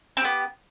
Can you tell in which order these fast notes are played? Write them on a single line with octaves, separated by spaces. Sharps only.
C4 G4 B3